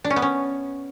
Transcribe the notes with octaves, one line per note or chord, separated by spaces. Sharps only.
D4
C#4
B3
C#4